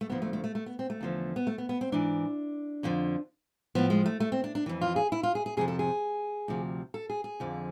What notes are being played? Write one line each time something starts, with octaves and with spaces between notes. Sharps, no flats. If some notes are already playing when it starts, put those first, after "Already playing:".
A3
D2 D3 F3 B3
A3
A3
A3
A3
B3
C4
A3
E2 D3 F3
B3
A3
B3
B3
C4
G#2 E3 D4
F2 D3 F3
A2 F3 B3
G#3
A3
A3
C4
D4
D4
F2 E3
F4
G#4
E4
F4
G#4
G#4
F2 C3 F3 G#4
A4
G#4
D2 C3 F3
A4
G#4
G#4
F2 D3 F3